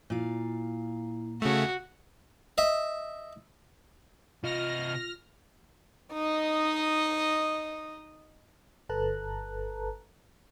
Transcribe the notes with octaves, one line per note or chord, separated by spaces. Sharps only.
A#2 E4 F5
C#3 A3 F#4
D#5 E5
C3 F4 D#5 F6 A#6
D#4 D#5
G1 A4 B4 A5 A#5 F#6